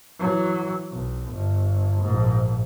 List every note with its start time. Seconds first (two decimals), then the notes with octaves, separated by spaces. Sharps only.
0.19 E3 F#3
0.91 B1
1.30 G1
2.02 A#1 G#2